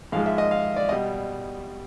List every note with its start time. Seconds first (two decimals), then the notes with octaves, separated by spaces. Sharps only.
0.12 G#2 F3 G#3 F5
0.26 E5
0.38 D#5
0.51 F5
0.76 D5
0.89 B2 G3 D#5